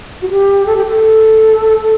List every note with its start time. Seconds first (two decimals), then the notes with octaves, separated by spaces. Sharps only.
0.22 F#4
0.30 G4
0.66 A4
0.77 G4
0.87 A4